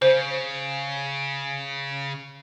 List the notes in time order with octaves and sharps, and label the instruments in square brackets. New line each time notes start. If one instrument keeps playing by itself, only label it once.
[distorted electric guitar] C#3 [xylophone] C5